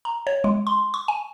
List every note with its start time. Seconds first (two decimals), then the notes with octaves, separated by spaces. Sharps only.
0.05 A#5
0.27 C#5
0.44 G#3
0.67 C6
0.94 C#6
1.08 G#5